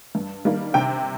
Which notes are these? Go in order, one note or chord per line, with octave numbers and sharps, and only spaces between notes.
G2
D#3 G3 A#3
C3 G5